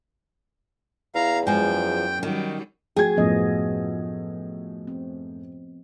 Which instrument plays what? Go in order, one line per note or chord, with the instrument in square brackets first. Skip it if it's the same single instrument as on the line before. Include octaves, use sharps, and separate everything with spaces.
[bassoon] E2 [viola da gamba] E4 [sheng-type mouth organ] F5 A#5
[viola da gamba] F#2 [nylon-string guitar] F3 G#3 [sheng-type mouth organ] G5
[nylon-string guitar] D#3 [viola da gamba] F#3 G3 C#4
[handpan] F3 A3 F#4 [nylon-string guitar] G#4 [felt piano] G5 G#6
[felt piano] F#2 A2 [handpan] F3 B3 D#5
[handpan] C4